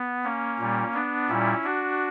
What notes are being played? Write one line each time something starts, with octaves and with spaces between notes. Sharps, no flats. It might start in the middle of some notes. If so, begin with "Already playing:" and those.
Already playing: B3
A#3 C#4
A#2 G3
B3 D4
A#2 G3 C#4 E4
D4 F#4